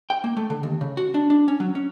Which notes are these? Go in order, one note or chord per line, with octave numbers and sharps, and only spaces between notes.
G5
A#3
A3
D3
D#2
C#3
F#4
D4
D4
C#4
F#3
C#4